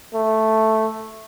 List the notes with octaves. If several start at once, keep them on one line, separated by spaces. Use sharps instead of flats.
A3